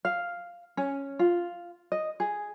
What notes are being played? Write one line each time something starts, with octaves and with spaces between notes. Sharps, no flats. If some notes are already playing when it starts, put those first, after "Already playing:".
F5
C#4
F4
D#5
G#4